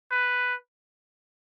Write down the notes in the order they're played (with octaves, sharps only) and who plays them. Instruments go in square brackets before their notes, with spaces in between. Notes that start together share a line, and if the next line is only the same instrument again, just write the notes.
[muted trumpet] B4